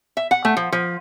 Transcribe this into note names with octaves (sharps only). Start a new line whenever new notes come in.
E5
F#5
A3
F3
F3